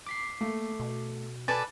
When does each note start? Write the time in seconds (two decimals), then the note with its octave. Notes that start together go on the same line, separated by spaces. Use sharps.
0.07 D6 B6 C7
0.41 A3 A#3
0.80 B2
1.48 A4 B4 D5 G#5 A6